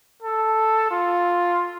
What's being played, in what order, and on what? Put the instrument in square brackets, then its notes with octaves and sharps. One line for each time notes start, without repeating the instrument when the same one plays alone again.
[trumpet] A4
F4